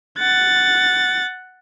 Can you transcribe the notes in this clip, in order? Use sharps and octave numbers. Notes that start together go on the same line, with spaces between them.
F#5 A6